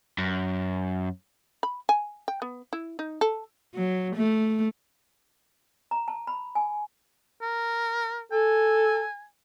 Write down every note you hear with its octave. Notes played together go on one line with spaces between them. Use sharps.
F#2
B5
G#5
G5
B3
E4
D#4
A4
F#3
A3
A#5
A5
B5
G#5
A#4
A4 G#5